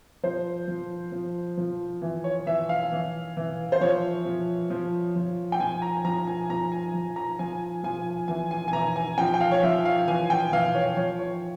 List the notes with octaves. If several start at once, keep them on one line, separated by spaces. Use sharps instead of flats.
F3 C5
F3
F3
F3
E3
C#5
E3 E5
F5
E3
E3
C5
F3 C#5
F3
F3
F3
G5
F3 G#5
A#5
F3 A#5
G#5
F3 A#5
G#5
F3
A#5
F3 G#5
F3 G#5
E3 G#5
G#5
G#5
E3 A#5
G#5
F3 G5
G5
F5
C#5
F3 E5
F5
E3 G#5
G5
E3 F5
C#5
F3 C#5
C#5